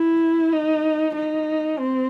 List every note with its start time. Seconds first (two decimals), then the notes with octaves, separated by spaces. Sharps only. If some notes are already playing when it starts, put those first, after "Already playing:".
Already playing: E4
0.53 D#4
1.15 D#4
1.78 C4